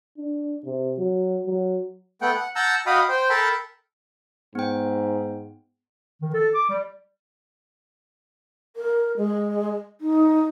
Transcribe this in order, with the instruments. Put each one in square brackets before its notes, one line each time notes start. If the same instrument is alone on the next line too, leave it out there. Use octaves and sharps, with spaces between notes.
[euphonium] D4
C3
F#3
F#3
[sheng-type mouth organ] A3 B3 F#5 G5
F#5
F#5 A5 A#5 E6 G6
F#4 D#5 F5 G5 B5 D#6
C5 G5
A4 A#4 G5 A5 B5
[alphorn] G#2 [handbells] B3 G5
[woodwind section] D#3
A4
D6
G3
[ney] A#4
G#3
D#4